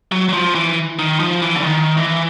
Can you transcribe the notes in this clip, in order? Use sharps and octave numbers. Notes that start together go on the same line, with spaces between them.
F#3
F#3
F3
E3
D#3
F3
E3
D3
D#3
E3